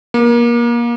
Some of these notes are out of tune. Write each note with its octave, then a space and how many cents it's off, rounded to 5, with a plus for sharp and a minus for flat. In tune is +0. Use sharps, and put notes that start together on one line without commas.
A#3 +30